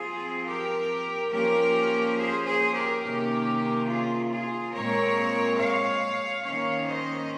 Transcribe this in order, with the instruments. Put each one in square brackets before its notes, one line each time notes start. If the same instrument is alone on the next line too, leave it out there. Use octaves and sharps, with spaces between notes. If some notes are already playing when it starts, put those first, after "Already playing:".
Already playing: [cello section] F3 C4 F4 G#4
G4 A#4
F3 A#3 C#4 G4 A#4
G#4 C5
G#4 C5
G4 A#4
C3 D#3 A#3 C#4 G4 A#4
F4 G#4
F4 G#4
A#2 G#3 C4 A#4 C#5
C#5 F5
D#3 A#3 C#4 C#5 F5
C5 D#5